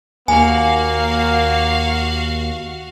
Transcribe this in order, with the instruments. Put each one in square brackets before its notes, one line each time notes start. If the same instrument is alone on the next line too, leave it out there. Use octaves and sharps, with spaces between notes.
[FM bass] D#2 [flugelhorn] A#3 [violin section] F#4 F5 [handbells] G#5